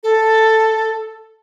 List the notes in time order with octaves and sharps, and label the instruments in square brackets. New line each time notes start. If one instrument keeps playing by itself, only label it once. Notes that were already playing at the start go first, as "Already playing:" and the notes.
[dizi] A4